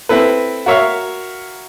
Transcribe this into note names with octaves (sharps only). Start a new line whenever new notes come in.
C4 E4 A4 B4
F#4 A#4 C#5 E5 F5